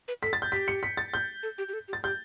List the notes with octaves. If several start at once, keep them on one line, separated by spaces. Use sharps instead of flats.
B4
A4 B6
A6
G6
G4 B6
C#7
B6
A6
G6
A4
G4
G4
A4
G4
A6
G4 G6